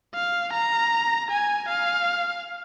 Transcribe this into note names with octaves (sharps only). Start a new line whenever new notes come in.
F5
A#5
G#5
F5